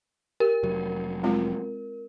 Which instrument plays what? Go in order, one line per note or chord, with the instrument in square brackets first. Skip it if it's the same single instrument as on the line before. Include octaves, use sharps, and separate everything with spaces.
[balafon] G4 [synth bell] A#4
[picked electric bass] F1 F#3
[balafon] G#3 C4 F4